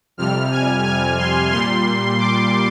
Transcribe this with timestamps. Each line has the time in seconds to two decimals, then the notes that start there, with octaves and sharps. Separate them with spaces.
0.17 F2 C3 G3 F6
0.51 G#5
0.85 G#5
1.18 C6
1.52 A#2 G3 C6
2.19 D6